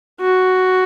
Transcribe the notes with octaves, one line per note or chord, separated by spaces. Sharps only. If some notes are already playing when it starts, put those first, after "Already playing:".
F#4